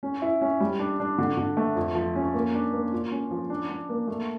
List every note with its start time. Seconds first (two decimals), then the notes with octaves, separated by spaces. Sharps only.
0.03 C#4
0.22 E4
0.41 C#4
0.60 G3
0.79 D4
1.00 D4
1.18 D3
1.37 D3
1.57 A3
1.76 F2
1.95 F3
2.16 C#4
2.34 A#3
2.54 D4
2.73 A#3
2.92 F4
3.12 C#4
3.31 F3
3.50 D4
3.69 D4
3.89 A#3
4.07 A3